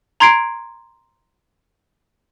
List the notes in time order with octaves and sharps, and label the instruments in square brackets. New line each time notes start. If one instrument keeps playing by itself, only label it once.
[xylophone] A#5 C6 G#6 C7 D7